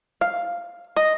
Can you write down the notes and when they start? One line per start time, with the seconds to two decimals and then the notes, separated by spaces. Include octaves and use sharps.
0.21 F5
0.97 D#5